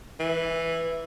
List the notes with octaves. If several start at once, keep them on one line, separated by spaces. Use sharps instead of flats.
E3